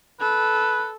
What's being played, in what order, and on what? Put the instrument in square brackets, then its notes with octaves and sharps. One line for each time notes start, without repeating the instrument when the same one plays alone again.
[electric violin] A4 [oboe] B4